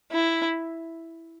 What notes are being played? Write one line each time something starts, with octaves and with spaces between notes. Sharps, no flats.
E4